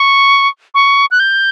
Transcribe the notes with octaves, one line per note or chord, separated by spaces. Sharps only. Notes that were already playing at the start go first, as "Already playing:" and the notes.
Already playing: C#6
C#6
F#6
G6